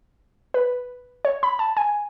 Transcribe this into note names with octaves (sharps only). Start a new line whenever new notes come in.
B4
C#5
B5
A5
G#5